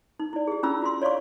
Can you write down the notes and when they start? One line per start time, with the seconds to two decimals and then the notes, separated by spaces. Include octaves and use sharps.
0.19 D#4
0.33 E4 D5
0.47 G4 G#4
0.63 C#4 D4 E4 F4 B5 E6
0.82 F4 F#4 C6
1.02 C#5 D5 F5 C6 C#6